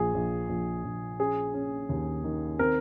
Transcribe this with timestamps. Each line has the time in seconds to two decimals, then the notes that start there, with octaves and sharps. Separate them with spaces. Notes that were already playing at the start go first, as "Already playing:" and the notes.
Already playing: A#1 G#4
0.14 A#1
0.49 A#1
0.84 A#1
1.19 C#4 G#4
1.54 C#4
1.89 D#2
2.24 D#3
2.59 C4 A#4